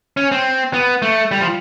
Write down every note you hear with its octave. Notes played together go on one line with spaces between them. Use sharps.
C#4
C4
B3
A3
G3
F3